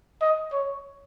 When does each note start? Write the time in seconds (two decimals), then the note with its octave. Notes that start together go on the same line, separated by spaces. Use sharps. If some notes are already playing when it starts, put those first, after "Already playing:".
0.22 D#5
0.52 C#5